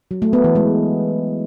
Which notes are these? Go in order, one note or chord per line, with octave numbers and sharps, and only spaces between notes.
F#3
A3
B3
E3
G#3